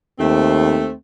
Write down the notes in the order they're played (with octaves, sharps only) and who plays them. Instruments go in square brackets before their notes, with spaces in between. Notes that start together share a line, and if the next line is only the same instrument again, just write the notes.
[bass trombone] D#2 [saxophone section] A3 C4